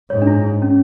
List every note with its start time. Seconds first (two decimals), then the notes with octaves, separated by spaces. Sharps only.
0.10 G#2 C#5
0.22 D4
0.27 E4
0.62 C#4